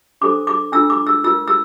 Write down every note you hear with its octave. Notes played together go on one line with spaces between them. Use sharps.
D4 A4 C5 D6
D6
D4 F4 A4 E6
D6
E6
F4 A#4 E6
E6